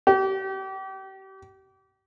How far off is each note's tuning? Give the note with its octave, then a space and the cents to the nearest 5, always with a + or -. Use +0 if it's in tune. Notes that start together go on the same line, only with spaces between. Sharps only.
G4 -35